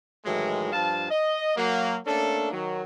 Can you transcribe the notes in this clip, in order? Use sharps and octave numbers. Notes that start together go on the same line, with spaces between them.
A2 D#3 E3 F#3 G#3
G2 F3 F5 A5
D#5
F#3 A#3
A3 A#3 C#4 D4 A4
D#3 F#3